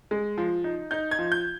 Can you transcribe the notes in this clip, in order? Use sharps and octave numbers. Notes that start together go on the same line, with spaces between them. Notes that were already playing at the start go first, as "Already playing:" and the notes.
G#3
F3
D#4
D#4 G6
G#6
F3
G6